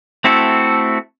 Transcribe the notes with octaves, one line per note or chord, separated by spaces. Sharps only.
A3 C4 E4 F#4 A4